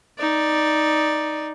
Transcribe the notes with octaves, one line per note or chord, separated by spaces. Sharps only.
D#4 D5